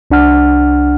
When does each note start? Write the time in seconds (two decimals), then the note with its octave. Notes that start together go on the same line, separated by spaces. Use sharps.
0.11 C2 D4 F#5 F6